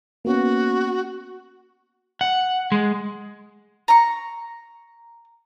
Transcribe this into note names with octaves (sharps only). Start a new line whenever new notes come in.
A#3 B3 C#4 F#4
F#5
G#3
A#5 C#6